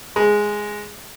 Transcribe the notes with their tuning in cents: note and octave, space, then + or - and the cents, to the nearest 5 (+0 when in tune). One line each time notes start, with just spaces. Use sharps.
G#3 +0